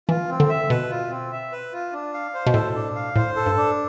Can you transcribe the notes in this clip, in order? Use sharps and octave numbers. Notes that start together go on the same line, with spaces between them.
E3 F4
C4
D3
E5
B2 B4
F4
C4
E5
B4
F4
D4
F5
C5
B2
A2 A4
D4
F5
A2 C5
A4
G2
D4